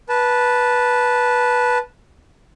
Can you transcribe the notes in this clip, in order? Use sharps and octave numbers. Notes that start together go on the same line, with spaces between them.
B4 A5